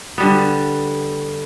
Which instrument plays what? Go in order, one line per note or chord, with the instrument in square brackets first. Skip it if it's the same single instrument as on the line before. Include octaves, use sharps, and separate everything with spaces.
[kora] D3 G3 B3